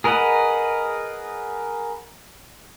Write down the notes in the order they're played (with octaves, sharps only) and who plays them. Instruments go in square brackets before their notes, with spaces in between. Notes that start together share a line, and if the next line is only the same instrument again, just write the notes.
[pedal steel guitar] G#4 A#4 B4 D#5 F#5